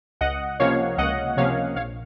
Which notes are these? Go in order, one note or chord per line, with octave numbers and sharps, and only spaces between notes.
C#2 D#5 F#5
C3 F3 A#3 C#4 C#5 F5
C#2 D#5 F#5
C3 F3 A#3 C#4 C#5 F5
A#1 C#5 F5